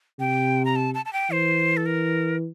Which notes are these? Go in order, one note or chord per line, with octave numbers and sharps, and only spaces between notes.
C3 G5
A#5
A5
A5
A5
G5
E3 C5
A4
A#4